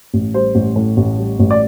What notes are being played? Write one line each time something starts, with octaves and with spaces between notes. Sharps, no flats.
A1
G3 C5
A1
A2
A1
G3
A1
D5